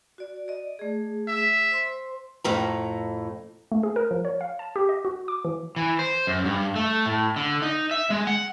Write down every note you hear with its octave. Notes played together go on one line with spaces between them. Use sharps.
F#4 D5
D5 D#5
A3 G#4
E5
C5 C6
F2 A2 A#5
A3
G#4
A#4
F3
C#5
F5
A5
G4
D#5
F#4
D6
E3
E3
C5
F#2
G2
A3
A2
D3
D#4
E5
G#3
F#5